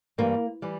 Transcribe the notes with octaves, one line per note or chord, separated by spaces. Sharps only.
G2 E3 G3 A#3
E3 G3